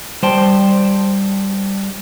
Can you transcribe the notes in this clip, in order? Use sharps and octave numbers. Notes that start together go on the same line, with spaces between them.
G3 C5 G5 A5